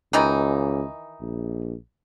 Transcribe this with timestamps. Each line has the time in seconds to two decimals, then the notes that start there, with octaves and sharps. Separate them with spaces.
0.13 C#2 D#3 E3 D#4
1.21 A#1